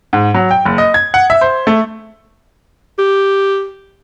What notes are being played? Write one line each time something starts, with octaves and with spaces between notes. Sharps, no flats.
G#2
F#3
G5
F#1
D#5
G#6
F#5
E5
C5
A3
G4